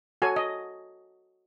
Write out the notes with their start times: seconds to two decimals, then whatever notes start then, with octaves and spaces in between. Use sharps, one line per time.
0.22 F#4 A4 C#5 G#5
0.36 D#5